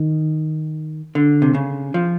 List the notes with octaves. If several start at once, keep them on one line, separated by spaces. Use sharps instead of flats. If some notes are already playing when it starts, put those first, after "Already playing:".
Already playing: D#3
D3
C3
C#3
F3